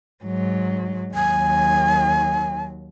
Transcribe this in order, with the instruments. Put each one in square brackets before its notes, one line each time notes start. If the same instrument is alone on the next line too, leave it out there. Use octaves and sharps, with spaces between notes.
[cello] G#2 F#3
[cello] D#2 F#3 [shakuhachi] G#5